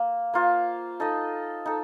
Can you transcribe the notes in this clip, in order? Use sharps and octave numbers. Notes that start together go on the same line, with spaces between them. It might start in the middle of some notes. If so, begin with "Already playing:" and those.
Already playing: A#3
A#3 F4 C5
D#4 A4 D#5
D#4 A4